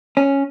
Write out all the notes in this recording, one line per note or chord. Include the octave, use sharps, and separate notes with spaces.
C#4